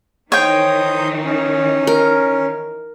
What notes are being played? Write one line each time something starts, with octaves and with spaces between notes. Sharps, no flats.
D#3 E3 D#4 C5 C#5 G5 D#6 G6
C#4
A#4